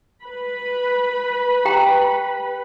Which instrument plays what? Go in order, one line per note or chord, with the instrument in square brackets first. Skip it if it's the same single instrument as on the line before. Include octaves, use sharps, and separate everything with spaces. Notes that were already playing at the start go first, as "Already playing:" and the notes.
[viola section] B4 B5
[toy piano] G4 G5 A#5